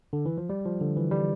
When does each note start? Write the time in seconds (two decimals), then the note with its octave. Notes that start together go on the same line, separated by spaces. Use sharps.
0.13 D3
0.26 E3
0.38 F3
0.49 G3
0.65 F3
0.81 D3
0.96 E3
1.11 G3